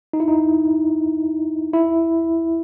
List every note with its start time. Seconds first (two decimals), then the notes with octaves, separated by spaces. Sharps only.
0.13 D#4
0.20 E4
0.28 D#4
1.73 E4